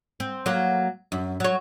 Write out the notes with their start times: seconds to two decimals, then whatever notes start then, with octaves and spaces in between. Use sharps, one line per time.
0.20 C4
0.46 F#3 A#3
1.12 F#2
1.40 F#3 C#5